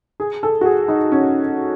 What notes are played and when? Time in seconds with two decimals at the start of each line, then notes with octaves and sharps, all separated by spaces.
0.20 G#4
0.43 A4
0.61 F#4
0.65 G#4
0.88 D#4
1.12 C#4